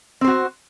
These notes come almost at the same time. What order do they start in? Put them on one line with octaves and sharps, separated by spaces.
C4 C5 F#4